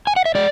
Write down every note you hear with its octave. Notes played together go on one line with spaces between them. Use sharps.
G#5
F#5
E5
G#3 D5